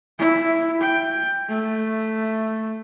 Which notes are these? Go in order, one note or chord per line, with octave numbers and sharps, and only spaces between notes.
E4
G5
A3